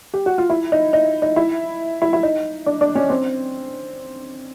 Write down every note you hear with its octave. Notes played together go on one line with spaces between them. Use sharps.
G4
F#4
F4
E4
D#4
D#4
D#4
E4
E4
E4
D#4
D4
D4
C#4
C4